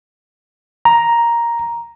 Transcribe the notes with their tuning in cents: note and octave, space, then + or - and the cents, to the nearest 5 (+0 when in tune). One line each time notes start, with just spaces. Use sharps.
A#5 +5